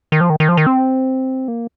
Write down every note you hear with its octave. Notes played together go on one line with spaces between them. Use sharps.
D#3
F3
D#3
D#3
F3
D#3
C4
A#3